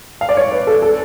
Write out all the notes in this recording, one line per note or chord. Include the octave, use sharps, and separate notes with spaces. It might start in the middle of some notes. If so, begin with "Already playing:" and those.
F5
D5
C#5
B4
A4
A4